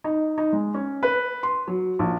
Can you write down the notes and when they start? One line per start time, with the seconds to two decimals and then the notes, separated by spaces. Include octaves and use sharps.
0.04 D#4
0.38 D#4
0.52 G#3
0.74 C#4
1.03 B4
1.43 C6
1.67 F#3
1.99 A#1